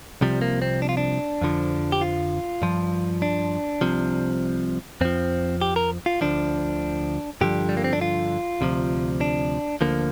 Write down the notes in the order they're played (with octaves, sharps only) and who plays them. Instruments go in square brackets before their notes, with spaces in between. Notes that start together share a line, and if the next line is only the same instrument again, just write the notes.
[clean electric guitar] C2 C3 F3 G3
A#3
C4
D4
F4
D4
F2 D3 F3
G4
F4
G2 F3
D4
C2 C3 F3
F2 F3 C4
G4
A#4
F4
D2 D3 F3 D4
G2 D3 F3 G4
G3
A#3
C4
D4
F4
D2 C3 F3
D4
D2 D3 F3 A#3